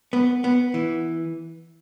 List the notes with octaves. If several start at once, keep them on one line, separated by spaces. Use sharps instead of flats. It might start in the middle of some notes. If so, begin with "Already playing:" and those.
B3
B3
E3